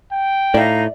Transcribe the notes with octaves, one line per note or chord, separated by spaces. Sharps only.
G5
A2 D#4 D5 E5 F5 A#5